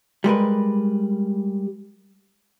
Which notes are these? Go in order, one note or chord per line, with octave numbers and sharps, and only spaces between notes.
G3 G#3 A#4 B4